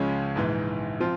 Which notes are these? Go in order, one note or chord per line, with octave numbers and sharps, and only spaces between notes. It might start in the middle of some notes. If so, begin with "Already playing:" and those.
Already playing: C#2 C#3 F3 G#3 C#4
A#1 G#2 E3
F3 C4 F4